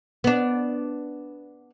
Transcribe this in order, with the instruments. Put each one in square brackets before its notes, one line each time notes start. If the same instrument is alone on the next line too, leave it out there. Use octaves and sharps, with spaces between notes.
[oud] B3 D4